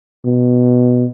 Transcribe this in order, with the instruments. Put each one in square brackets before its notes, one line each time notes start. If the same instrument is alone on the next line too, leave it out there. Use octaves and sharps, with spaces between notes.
[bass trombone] B2